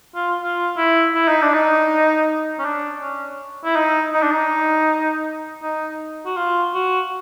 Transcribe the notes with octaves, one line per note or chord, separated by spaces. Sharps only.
F4
F4
E4
E4
D#4
D4
D#4
C#4
D4
C#4
E4
D#4
D#4
D4
D#4
D#4
F#4
F4
F#4